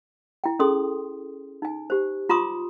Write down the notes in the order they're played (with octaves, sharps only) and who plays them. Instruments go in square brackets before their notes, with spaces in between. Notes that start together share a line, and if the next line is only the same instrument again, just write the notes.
[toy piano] E4 G5
C#4 G#4 A4 C6 D#6
D#4 G#5
G4 C5
F4 A#5 C6 D6 D#6